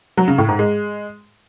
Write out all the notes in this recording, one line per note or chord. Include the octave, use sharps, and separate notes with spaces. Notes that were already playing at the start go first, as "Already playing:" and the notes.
F#3
C#3
A2
G#2
G#3